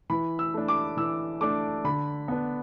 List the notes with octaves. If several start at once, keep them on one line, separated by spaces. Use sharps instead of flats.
E3 B5
E6
A3 D4
D6
E3 E6
A3 D4 D6
D3 B5
B3 D4